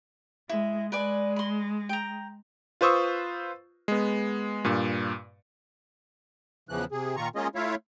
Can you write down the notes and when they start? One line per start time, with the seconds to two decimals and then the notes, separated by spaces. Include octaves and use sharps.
0.49 G#3 E4
0.92 G#3 B4 D5 G#5
1.36 B5 C6
1.89 G5 A#5
2.81 F4 B4 C5 C#6 D#6 E6
3.88 G#3 B3
4.64 G2 A#2
6.69 E2 C#3 E3 F3 F#6
6.92 C3 G#4
7.16 A#2 D#3 F4 A#5 C#6
7.36 G#3 A#3 C#4 F4 G#4 D#5
7.55 A3 E4 F4 C#5 E5 F5